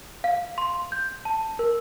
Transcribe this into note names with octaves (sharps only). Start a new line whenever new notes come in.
F5
C6
G6
A5
A#4